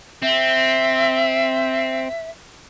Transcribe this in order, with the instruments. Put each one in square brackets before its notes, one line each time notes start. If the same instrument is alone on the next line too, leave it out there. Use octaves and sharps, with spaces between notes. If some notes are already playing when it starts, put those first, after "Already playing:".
[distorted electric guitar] C4 [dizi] E5